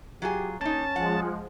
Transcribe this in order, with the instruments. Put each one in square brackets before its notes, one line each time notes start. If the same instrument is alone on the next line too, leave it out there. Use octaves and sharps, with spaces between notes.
[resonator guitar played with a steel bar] F#3 F4 G#4 [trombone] G4
[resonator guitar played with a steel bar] A#3 D#4 [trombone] C#4 [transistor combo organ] A5
[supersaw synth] F3 G#3 [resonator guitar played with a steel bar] F#5